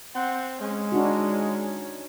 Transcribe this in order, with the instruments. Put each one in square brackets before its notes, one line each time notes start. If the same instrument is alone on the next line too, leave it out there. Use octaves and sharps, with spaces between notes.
[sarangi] C4 [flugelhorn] F#5
[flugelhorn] G#3 [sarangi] C#4
[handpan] D4 D#4 F#4